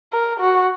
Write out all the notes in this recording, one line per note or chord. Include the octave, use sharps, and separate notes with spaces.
A#4
F#4